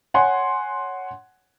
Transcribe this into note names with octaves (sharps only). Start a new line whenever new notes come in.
C#5 F#5 G#5 C6